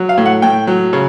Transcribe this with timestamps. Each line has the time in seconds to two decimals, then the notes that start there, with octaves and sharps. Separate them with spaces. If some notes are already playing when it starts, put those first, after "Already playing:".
Already playing: F#3
0.09 F5
0.18 A2
0.26 F#5
0.42 A2 G5
0.67 F#3
0.93 C#3